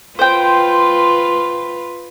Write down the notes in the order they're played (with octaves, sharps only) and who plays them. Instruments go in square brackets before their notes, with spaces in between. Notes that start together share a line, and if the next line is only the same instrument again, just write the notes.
[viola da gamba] F4 B4 [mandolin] C5 G5